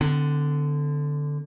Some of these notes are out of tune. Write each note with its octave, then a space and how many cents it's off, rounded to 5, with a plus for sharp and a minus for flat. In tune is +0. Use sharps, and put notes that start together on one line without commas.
D3 +0 C4 -45